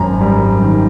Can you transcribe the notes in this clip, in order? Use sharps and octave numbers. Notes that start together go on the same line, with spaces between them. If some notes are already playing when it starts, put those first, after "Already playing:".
Already playing: G#1 F#2 A#5
G3
D#3